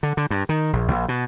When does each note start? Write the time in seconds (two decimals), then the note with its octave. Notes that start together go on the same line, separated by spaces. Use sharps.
0.03 D3
0.17 D3
0.31 G2
0.49 D#3
0.73 A#1
0.88 A#1
1.08 B2